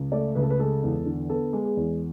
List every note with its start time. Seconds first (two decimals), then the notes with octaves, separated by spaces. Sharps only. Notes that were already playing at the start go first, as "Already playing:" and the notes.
Already playing: C#2
0.12 A3 D5
0.35 C#2 B4
0.42 A4
0.50 B4
0.60 G#3 A4
0.83 E2
1.06 D3
1.29 B3 A4
1.53 G#3
1.65 G#4
1.77 E2